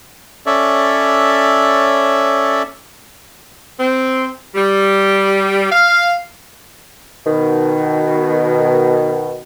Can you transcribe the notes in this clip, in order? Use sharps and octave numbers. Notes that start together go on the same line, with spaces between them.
C#4 A4 C#5 D5 E5
C4
G3
F5
B2 D#3